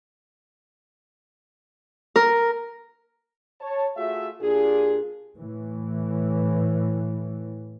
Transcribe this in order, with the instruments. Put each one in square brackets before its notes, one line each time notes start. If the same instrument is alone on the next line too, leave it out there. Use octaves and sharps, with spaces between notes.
[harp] A#4
[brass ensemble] C#5 A5
A3 F4 F#4 G#4 E5
A#2 D4 F4 G4 G#4
[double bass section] A2 E3